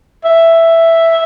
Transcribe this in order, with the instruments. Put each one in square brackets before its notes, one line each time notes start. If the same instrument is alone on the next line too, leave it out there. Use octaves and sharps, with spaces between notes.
[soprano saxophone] E5